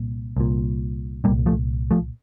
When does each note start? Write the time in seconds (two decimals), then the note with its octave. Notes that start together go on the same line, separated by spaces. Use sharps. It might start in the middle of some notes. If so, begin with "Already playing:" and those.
Already playing: C2 A#2
0.37 C2 A#2
1.24 C2 A#2 G3 A#3
1.46 F3 A3
1.91 F3 A3